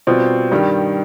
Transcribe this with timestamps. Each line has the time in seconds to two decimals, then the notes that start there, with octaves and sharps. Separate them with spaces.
0.07 B2 G3 C4 F4
0.51 G2 D#3 G3